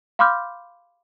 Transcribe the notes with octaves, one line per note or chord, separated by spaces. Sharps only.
F5 B5 C6 D6 F6 G6